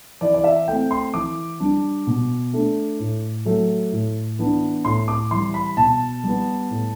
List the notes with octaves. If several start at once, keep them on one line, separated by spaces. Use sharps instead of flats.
E3 D5
D5
E5
A3 C4 G5
C6
E3 D6
G3 D4
B2
A3 D4
A2
F#3 A3
A2
E3 B3 D4
A2 C6
D6
E3 G3 C6
B5
B2 A5
G3 B3
A2